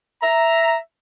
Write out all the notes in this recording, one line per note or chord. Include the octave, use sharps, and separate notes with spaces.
E5 A#5